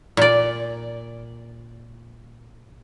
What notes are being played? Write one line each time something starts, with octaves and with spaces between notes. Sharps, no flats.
A#2 D5